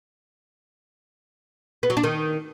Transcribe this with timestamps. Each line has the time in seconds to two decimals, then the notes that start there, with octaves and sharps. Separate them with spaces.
1.83 B3
1.90 F#3
1.97 D4
2.04 D#3